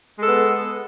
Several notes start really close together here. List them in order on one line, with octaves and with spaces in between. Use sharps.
G#3 A4 B3